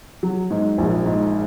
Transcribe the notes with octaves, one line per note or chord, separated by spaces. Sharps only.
F#3
G#2
A#1
G#2